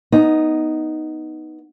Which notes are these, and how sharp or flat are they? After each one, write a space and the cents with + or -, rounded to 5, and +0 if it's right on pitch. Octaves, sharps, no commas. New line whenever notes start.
B3 -5 D#4 +0